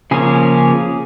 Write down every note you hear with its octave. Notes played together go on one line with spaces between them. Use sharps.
C#3 F3 A#3 C#4 G#4